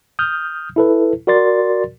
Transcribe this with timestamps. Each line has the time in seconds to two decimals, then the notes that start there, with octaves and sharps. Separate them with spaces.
0.19 D#6 F6 G6
0.76 E4 A4 B4
1.27 F#4 A#4 D5 C6 A6